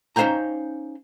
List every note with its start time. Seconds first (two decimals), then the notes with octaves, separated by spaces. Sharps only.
0.16 C#4 D#4 C5 F5 G5 A#5